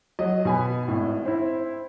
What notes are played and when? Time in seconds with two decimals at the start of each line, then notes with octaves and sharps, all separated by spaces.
0.19 F#3 D#5
0.45 B2 G#5 B5
0.88 G#1 A2
1.25 C4 E4